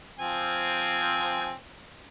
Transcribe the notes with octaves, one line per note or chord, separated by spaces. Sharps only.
F3 C4 G#5